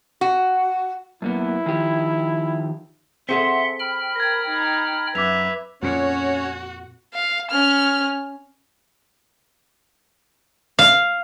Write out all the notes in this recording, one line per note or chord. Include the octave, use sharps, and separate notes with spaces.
F#4
F#2 A#3 B3 E4
D#3 F3 G4
C4 G#4 A4 E5 F#5 C6 B6
G5 B5 F6
A#4 G#6 A#6
D#4 A#5
F#2 B4 E5 D6 B6 F7
F2 A#2 C#4 F#4 C#5
F5
C#4 F6
F5